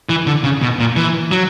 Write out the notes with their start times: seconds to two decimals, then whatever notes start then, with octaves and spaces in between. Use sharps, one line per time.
0.09 E3
0.27 D3
0.43 C#3
0.62 B2
0.79 A#2
0.96 E3
1.31 F#3